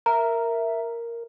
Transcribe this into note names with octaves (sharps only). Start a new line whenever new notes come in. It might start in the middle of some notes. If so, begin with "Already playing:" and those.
A#4 E5 A#5